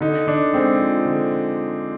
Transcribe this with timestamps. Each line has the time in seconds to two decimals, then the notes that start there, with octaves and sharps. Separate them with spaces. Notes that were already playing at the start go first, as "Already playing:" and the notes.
0.01 D3 D#4
0.27 D3 D4
0.53 G#3 C4
0.79 F3
1.05 D3